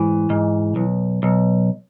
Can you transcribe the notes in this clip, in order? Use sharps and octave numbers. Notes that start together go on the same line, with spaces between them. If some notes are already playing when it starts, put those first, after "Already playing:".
Already playing: G#2 E3
G#2
B1
B1